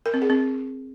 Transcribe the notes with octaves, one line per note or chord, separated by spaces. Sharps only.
A#4
C4
G#4
C4